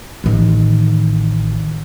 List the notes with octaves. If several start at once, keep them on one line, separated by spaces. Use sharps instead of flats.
A1 D#3